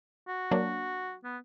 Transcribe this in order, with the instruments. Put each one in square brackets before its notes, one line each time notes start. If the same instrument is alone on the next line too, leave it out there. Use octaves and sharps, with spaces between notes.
[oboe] F#4
[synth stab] F#3 A#3 D4
[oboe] B3